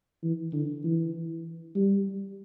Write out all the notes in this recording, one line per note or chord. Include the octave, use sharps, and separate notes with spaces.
E3
D3
E3
G3